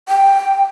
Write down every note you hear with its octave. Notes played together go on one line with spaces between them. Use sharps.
G5